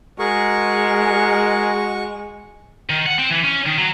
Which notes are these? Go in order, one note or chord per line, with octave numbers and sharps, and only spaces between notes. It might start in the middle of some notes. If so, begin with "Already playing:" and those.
G#3 F#4 G#4 A#4 C#6
D#3
F#5
C4
E3
C#4
D#3
F#3